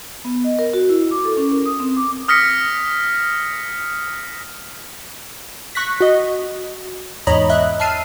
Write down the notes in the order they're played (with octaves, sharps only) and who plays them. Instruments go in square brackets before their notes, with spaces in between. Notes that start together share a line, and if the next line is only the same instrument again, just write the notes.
[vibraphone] B3
D#5
A#4
F#4
E4
D6
A4
C#4
A#4
D#6
C4
D6
[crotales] D#6 F6 A#6 B6 C#7
[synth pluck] C#6 F#6 A#6 B6
F#4 D#5
E2 G#2 C#5 D#5 A#5 B5
D#5 E5 F#6
E5 A5 E6 F6 C7 D#7